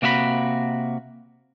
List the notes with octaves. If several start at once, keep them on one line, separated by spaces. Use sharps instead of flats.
C3 A#3 F#4 E5 B5